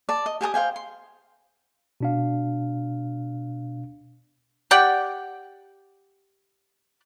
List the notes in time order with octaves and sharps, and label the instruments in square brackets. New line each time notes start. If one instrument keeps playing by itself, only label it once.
[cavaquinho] D5 A5
D#5
G4 G#5 A5 D#6
C5 F5 G5 G#5
C6
[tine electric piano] B2 D4 F5
[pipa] G4 D5 F#5 G5